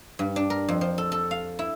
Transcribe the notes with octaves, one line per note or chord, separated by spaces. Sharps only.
G2
D4
A#4
F2
F3
A4
A4
F5
E4